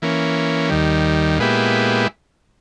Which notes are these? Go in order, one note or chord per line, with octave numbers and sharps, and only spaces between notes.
E3 A#3 C#4
D#2 D#3 G3
A#2 G#3 B3 E4 G4